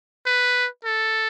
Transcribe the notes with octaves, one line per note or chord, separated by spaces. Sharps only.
B4
A4